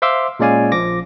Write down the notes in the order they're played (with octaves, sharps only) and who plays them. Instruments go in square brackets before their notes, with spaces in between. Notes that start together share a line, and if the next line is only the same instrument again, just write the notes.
[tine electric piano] C5 E5 F5 C6 D6 E6
A#2 G#3 C#4 D5 F5 G#5
A#1 F3 D6 A#6